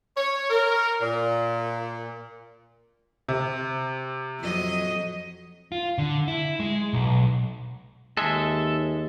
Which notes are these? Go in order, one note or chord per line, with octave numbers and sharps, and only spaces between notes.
C#5
A#4
A#2
C3
F2 F#3 D#5
F4
D3
E4
G#3
B1
D#2 G#3 A4 E5